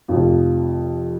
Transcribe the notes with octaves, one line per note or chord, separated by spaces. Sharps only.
F1 F2 F3